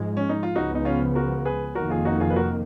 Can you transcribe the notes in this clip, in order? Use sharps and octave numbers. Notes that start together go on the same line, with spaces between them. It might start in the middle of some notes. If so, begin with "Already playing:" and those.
Already playing: G#2 F3 G#3
C#4
D#4
F4
C#2 C#3 F3 B3 D#4 F#4
D#4
C#4 F4
F#4 A#4
G#4 B4
F1 F2 D#3 A#3 F#4 A#4
F4 G#4
D#4 F#4
F4 G#4
B4
F#4 A#4